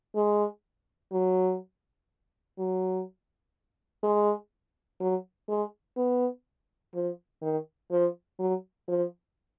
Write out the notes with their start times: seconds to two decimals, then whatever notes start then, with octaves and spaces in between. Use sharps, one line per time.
0.16 G#3
1.12 F#3
2.58 F#3
4.03 G#3
5.00 F#3
5.49 G#3
5.97 B3
6.94 F3
7.42 D#3
7.91 F3
8.39 F#3
8.88 F3